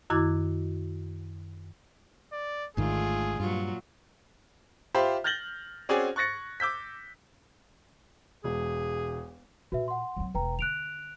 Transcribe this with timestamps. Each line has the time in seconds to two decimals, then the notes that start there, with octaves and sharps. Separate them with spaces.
0.10 F#2 D#3 E4 F#4 D6 G#6
2.33 D5
2.77 G#1 G#2 D3 D#3 A3 F4 G#4
3.40 G2 A#2 F#3 F4
4.95 F4 G4 C5 E5 B5
5.24 F6 G6 A6 A#6 F#7 G7
5.89 C4 C#4 F#4 G#4 D5 G#5
6.16 C#6 F#6 A6 A#6 C#7
6.60 D6 E6 G6 B6
8.44 E1 G#4
9.72 A#2 F#4 B4 E5
9.88 F#5 C6
10.17 F#3 C4
10.35 E1 B4 G5 A#5
10.59 D3 F#6 D7 F7